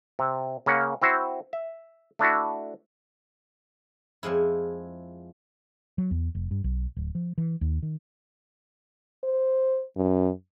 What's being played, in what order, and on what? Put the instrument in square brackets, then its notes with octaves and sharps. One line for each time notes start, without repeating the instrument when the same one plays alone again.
[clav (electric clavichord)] C3
C#3 A#3 C#4 F#5
C4 E4 F#4 C5
E5
A3 D4 E4 F#4
[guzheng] F2 F3 G#3 E4
[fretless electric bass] F#3
E2
F1
G2
B1
D1
F3
E3
D#2
D#3
[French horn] C5
F#2